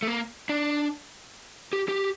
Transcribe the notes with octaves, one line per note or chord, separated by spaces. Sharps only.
A3
A#3
D4
G4
G4